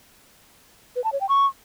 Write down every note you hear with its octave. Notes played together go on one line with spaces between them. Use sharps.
B4
A5
C#5
G5
C#6